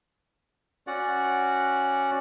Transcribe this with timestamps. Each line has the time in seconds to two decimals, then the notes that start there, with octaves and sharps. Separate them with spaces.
0.87 C#4 F#4 D5 F#5